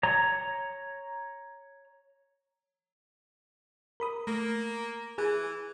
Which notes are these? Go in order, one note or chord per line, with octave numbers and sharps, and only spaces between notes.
C#5 A#5
A#4 B5 D#6
A3 A#3
E3 G#4